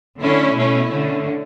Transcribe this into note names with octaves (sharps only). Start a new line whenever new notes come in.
D3 A3 C#4 E4
B2 A3 C#4 E4
D3 A3 C#4